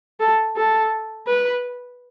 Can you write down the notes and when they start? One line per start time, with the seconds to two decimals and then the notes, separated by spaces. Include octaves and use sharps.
0.20 A4
0.56 A4
1.27 B4